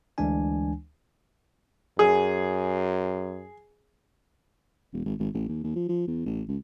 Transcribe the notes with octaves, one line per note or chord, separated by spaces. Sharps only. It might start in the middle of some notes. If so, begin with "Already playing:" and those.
D2 E3 G#3 D4 G#5
F#2 G#4
E1
G#1
G#1
A1
D#2
D#2
F3
F3
E2
A1
C#2